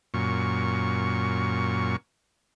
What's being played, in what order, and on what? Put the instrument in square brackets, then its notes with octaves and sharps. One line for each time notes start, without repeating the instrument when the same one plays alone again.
[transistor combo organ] F#2 A#2 C#6